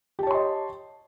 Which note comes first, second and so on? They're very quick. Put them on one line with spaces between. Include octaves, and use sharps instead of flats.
G4 A5 C#5 C6 D#5